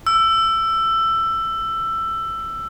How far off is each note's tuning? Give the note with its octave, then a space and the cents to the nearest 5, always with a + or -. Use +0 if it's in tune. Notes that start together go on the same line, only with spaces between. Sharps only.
E6 +15